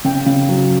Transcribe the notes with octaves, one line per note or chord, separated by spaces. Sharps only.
C#3 G5
C#3
F#3